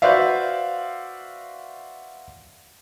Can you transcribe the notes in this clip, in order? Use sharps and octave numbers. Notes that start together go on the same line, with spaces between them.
F#4 B4 C5 D5 E5 F5